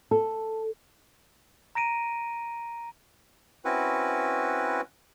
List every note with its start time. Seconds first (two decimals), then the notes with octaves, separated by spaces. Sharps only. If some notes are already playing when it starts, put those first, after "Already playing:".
0.11 A4
1.75 A#5 A#6 D7 D#7
3.65 C4 C#4 E4 F#4 B4